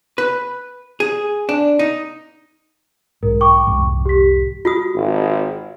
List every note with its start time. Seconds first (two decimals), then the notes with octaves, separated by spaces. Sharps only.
0.18 B4
1.00 G#4
1.49 D4
1.79 D#4
3.23 B1 G#2 A#4
3.41 G5 C#6 D6
3.67 C2 F2 G#2
4.05 G4 B6
4.65 F4 F#4 D#6
4.95 G#1